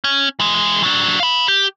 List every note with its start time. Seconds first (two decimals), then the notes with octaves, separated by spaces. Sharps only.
0.04 C#4
0.40 E3 G#3
0.83 F#3 D4
1.20 F5 B5
1.48 G4